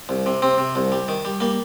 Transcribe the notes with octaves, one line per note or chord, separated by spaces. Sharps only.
C2
C3
C3 C4
C3
C2
G3
D#3
G3
G3 A#3